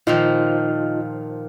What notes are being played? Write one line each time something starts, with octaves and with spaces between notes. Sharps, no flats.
A#2 D#3 F3 D#4 F4 D#5